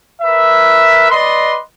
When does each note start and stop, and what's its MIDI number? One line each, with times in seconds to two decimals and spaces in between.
0.22 1.09 70
0.22 1.09 71
0.22 1.09 76
1.11 1.56 71
1.11 1.56 74
1.11 1.56 75
1.11 1.56 84